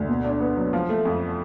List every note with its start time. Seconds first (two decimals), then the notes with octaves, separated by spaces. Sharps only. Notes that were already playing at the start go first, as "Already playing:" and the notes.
Already playing: D2
0.09 B2
0.25 D4
0.41 B3
0.57 F#3
0.73 F3
0.89 A3
1.05 F2